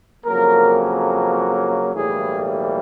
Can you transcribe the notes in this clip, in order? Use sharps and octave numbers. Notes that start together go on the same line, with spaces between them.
F2 C#3 F#3 A#3 A#4
B1 A2 E3 G3 A#3 G#4